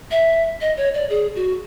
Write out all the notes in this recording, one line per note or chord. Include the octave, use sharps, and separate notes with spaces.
E5
D#5
C#5
D5
G#4
F#4